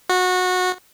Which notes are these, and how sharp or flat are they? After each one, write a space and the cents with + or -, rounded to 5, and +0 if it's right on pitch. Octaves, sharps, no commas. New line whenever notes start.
F#4 -20